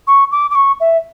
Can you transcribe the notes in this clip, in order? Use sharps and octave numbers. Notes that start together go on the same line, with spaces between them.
C#6
D6
D6
C#6
E5